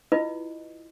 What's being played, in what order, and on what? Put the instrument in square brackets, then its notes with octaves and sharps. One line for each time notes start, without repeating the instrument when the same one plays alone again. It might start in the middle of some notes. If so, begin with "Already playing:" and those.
[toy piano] E4 F4 B4 D#5